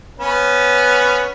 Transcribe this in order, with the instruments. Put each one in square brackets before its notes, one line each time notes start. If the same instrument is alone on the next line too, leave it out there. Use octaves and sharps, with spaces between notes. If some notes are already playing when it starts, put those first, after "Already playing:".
[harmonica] B3 C#4